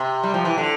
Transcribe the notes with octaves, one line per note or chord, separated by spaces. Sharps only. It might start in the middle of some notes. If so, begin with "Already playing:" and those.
Already playing: C3
G3
F3
E3
D3